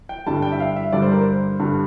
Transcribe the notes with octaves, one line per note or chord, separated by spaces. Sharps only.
G5
G2 D3 G3 A5
G5
E5
F5
E5
G2 D3 G3 D5
C5
A#4
C5
G2 D3 G3